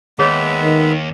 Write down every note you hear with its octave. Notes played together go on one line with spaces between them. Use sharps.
D#2 G#3 B3 G#4 C#5 D#5 E5
D#3